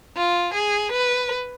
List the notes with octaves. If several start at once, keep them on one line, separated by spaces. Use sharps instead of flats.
F4
G#4
B4